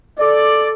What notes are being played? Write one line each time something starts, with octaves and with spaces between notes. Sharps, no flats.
A4 D5